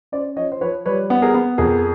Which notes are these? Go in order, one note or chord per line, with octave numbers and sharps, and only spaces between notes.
C#4 C5 D5
F3 C#5 D#5
C5
F3 B4 C#5
G3 B4 C#5
B3
G#4 A#4
B3
F2 G#4 A#4